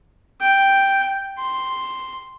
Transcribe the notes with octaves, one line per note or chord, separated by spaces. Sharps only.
G5
C6